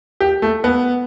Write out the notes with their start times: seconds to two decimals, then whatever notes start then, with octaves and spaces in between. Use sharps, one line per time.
0.20 G4
0.42 A3
0.64 B3